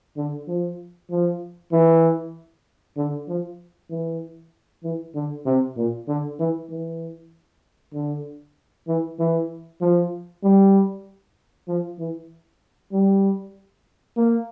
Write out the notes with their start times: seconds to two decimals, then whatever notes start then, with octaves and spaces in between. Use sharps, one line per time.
0.17 D3
0.48 F3
1.10 F3
1.72 E3
2.97 D3
3.28 F3
3.90 E3
4.84 E3
5.15 D3
5.46 C3
5.77 A#2
6.08 D3
6.39 E3
6.70 E3
7.94 D3
8.88 E3
9.19 E3
9.81 F3
10.44 G3
11.68 F3
11.99 E3
12.92 G3
14.17 A#3